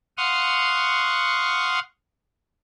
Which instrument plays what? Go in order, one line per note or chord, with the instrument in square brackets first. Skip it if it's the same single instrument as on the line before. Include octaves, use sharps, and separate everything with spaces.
[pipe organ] F5 F#5 C6 C#6 D#6 F6